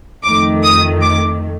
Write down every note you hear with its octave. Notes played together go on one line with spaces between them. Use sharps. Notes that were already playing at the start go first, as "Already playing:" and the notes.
F2 D#3 A3 D6
D#6
D6